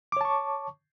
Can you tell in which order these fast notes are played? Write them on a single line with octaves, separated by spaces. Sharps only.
D6 C#5 A5 C#6